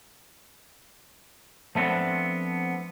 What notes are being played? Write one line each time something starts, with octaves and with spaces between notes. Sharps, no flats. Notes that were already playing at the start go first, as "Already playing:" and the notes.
F3 A3 B3 C4 D4